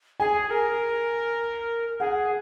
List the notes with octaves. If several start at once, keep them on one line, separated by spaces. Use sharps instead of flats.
G#4 G#5
A#4
G#4 F#5